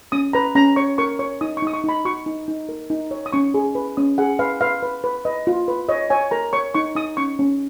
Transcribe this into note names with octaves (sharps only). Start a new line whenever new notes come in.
C#4 D#6
B4 A#5
C#4 A#5
C#5 C#6
A#4 C#6
C#5 C#6
D#4 D#6
C#6
D#4 D#6
C#6
D#4 B5
F#4 C#6
D#4
D#4
A#4
D#4
C#5
D#6
C#4 C#6
G#4
B4
C#4 D#6
G#4 F#5
B4 F5
B4 F5
B4
B4
B4 D#5
F4
B4
C#5 D#5
C#5 G#5
A#4 A#5
C#5 C#6
D#4 C#6
D#4 D#6
C#4 C#6
C#4